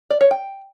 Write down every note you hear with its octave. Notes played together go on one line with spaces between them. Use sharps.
D5
C#5
G5